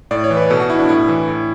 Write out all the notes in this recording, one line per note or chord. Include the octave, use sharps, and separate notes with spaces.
A2 D5
C#5
E3
B4
B2 A4
F#4
E4
D4
A2 E4
E3
A2